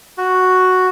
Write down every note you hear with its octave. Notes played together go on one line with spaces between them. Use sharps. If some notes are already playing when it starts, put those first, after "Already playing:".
F#4